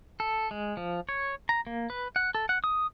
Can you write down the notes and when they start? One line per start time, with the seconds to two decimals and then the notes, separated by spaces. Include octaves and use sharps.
0.20 A4
0.51 G#3
0.77 F3
1.09 C#5
1.49 A#5
1.67 A#3
1.90 B4
2.16 F#5
2.35 A4
2.49 F#5
2.64 D#6